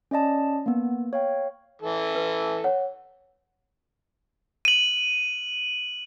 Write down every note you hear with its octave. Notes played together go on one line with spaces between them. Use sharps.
C#4 D5 D#5 A5
A#3 B3
C#5 F5 G5
E3 A4
B4
C#5 F#5
D#7 F#7